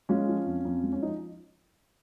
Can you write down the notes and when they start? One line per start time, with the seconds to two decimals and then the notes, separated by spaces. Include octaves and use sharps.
0.09 G#3 C#4 F4
0.29 F3
0.46 F2
0.65 F2
0.84 G#3
0.93 C#4
1.02 F3 D#4